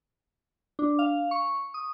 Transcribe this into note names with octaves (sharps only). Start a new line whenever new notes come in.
D4
F5
C#6
D#6